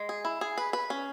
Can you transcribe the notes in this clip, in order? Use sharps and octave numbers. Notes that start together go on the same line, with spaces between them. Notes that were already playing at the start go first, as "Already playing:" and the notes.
Already playing: G#3
G#4
E4
G#4
B4
B4
C#4